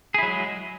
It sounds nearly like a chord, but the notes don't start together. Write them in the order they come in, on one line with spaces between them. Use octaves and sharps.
G#4 E4 F#3 G#3